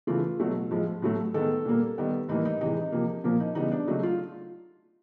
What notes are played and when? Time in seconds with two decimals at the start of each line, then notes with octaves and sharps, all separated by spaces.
0.07 C#3 E3 A3 F4
0.40 B2 F#3 A3
0.71 A2 F3 G#3
1.02 A2 F#3 A3
1.34 D#3 G#3 B3 A4
1.65 A#2 G3 A#3
1.98 D#3 G3 B3
2.29 A2 E3 G3 A#3 D#4
2.45 D#4
2.61 C3 E3 G#3 D#4
2.92 C3 F3 A#3
3.24 A#2 F3 A#3
3.40 D#4
3.55 C#3 E3 G3 B3 D#4
3.72 D4
3.87 C#3 F#3 A3 D#4
4.03 F4